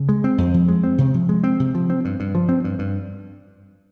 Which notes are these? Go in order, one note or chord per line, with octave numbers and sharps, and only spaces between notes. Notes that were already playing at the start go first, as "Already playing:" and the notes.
Already playing: C#3
G#3
C4
F2
F3
G#3
C4
C3
F3
G#3
C4
C3
F3
C4
G2
G2
F3
C4
G2
G2